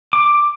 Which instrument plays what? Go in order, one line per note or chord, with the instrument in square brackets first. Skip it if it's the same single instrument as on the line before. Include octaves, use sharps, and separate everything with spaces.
[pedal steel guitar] D6